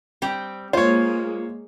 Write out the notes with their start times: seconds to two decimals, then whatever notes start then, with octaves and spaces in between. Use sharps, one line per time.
0.22 G3 C4 G5
0.73 G#3 A#3 F4 C5 C#5